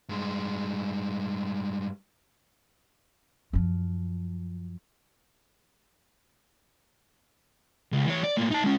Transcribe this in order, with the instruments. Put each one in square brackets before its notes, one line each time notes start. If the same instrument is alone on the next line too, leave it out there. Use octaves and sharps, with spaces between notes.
[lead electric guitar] G2 G#3
[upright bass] F#2 F3
[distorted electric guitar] C#2
E3 C#5
D5
A2 A#3
D#4 A5
G#3 C#4